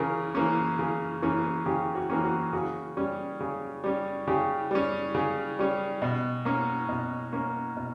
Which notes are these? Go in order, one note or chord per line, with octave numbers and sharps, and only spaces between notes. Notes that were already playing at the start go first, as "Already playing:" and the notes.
Already playing: C#3 E3 A#4
E3 A#3 C#4
C#3
E3 A#3 C#4
C#3 G4
F#4
E3 A#3 C#4
F#4
C#3 F#4
G3 C#4
C#3
G3 C#4
C#3 G4
G3 C#4
C#3
G3 C#4
B2
A#3 C#4
B2
A#3 C#4
B2